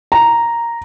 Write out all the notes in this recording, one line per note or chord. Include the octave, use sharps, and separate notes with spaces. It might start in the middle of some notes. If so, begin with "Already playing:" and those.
A#5